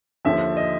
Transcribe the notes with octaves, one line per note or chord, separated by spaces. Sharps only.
D#2 D3 F3 E5
D#5